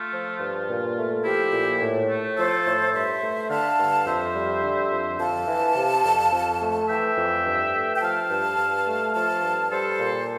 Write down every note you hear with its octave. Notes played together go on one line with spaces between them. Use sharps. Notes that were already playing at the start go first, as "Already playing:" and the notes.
Already playing: A3 F4
F3
G2
A#2
A3
F3 E4 G4
A#2
A2
A3
F3 A4 C5
A2
G2 C5 E5
A3
D3 F5 A5
G2
F2 C5 E5
G3
D3
F2
F2 F5 A5
E3
C3
F2
F2
A3
E3 E5 G5
F2
G2
A3
G5
F3 F5 A5
G2
G2
A3
F3 F5 A5
G2
G3 A4 C5
A#2